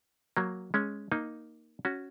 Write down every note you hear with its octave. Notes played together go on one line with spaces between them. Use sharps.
F#3 A#3
G#3 C#4
A#3 D#4
C#4 F#4